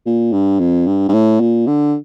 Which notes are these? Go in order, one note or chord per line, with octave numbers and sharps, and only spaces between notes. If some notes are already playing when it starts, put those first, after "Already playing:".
A#2
G2
F2
G2
G2
A2
A#2
D3